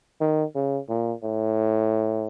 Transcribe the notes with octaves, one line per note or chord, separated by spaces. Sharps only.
D#3
C#3
A#2
A2